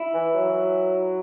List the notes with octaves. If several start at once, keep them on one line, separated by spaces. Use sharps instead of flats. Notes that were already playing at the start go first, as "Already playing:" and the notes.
Already playing: E4
E3
F#3